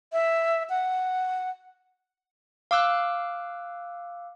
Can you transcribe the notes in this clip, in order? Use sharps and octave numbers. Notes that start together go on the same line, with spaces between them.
E5
F#5
F5 D6 E6 F#6